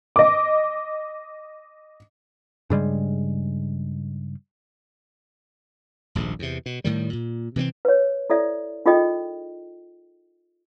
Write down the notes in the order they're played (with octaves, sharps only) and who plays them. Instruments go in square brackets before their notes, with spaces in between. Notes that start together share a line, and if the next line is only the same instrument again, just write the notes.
[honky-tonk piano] D#5 D6
[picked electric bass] G2 C#3 G3 G#3
[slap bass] D#1 A#1 G#2
E2 C3
B2
A2 D#3 G3
A#2
C3 E3 F3 C4
[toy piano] B4 C#5
E4 A4 D5 E5
D#4 F4 G#4 A4 D#5 G5